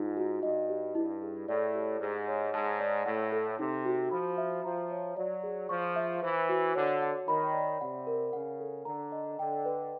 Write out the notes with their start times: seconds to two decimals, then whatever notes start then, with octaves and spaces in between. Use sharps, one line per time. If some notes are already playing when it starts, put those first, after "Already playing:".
Already playing: G#2 D#4 F4
0.17 F#4
0.43 G2 D#5
0.69 G4
0.95 G2 E4
1.22 G#4
1.48 A2 D5
1.75 G4
2.01 G#2 G#4
2.28 C#5
2.53 G#2 A5
2.80 D5
3.06 A2 F#5
3.32 A4
3.59 C3 D#4
3.85 F#4
4.11 F3 B5
4.38 E5
4.64 F3 A#5
4.91 C#5
5.17 F#3 D5
5.43 G#4
5.69 F3 C#6
5.96 E5
6.23 E3 C5
6.49 F#4
6.75 D3 C#5
7.02 F#5
7.28 D#3 B5
7.54 D5
7.81 C3 F#5
8.07 A#4
8.33 C#3 F#5
8.60 A4
8.85 D3 A#5
9.12 D#5
9.39 D3 G5
9.65 B4